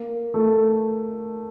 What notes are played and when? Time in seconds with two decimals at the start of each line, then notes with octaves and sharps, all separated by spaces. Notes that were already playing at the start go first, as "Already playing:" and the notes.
Already playing: A#3
0.34 A3